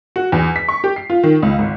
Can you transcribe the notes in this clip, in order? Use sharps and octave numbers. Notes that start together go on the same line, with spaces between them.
F#4
E2
B6
C#6
G4
C7
F4
D#3
C#2
G#1